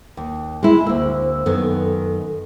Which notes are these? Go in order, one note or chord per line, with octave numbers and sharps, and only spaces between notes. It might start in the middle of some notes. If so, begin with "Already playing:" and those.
D#2
G#3 E4
D2 A#3 C5 E6
F#2 D#3 B3 A4